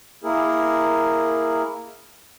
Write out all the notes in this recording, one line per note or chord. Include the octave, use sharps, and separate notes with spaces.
A#3 E4 G#4 A#4